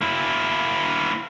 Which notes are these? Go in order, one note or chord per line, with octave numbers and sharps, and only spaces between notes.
A#3 E4